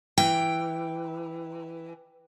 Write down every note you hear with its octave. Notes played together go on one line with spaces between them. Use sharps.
E3 G5